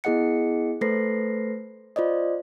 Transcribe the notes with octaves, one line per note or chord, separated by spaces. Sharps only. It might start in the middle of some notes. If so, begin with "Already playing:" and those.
B3 E4 G#4 D#5 F#5 C#7
A3 A4 B4 C5 A#6 C7
F4 C5 D5 D#5